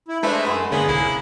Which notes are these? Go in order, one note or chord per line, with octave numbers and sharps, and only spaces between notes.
E4
G#3 A3 D4 B4 C5 E5
F#2 B4 F#5 C6
G#2 D3 A#3 B3 C#4 G#4
C2 E4